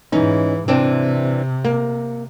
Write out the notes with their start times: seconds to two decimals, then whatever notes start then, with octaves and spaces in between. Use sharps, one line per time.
0.12 G#2 E3 C#4 D#4
0.68 C3 E3 C4 D4
1.64 A#3